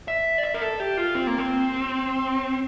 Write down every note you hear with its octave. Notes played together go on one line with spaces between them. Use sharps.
E5
D5
E5
A#4
A4
G4
F4
C4
A#3
C4